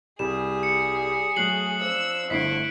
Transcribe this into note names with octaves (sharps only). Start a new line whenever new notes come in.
C2 G3 G#4 E7
C#7
F#3 A3 F#6 C7 F#7
F3 D5 E6
G1 D3 A3 E4 B6 C7 D7